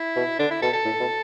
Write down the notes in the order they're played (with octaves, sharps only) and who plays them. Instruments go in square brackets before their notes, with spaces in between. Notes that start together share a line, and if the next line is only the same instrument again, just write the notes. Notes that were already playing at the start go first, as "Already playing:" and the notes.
Already playing: [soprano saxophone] E4
[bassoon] B2
[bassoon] D3 [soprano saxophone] D4
[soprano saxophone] E4
[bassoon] B2 [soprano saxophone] A4
[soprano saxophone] A4
[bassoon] A2
B2